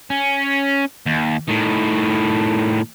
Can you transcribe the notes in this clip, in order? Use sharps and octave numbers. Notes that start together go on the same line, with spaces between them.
C#4
D#2
A2 D#3